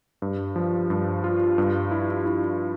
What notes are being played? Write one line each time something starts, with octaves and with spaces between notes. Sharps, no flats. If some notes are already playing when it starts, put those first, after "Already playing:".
G2
F3
G2
F4
G2
E4
E4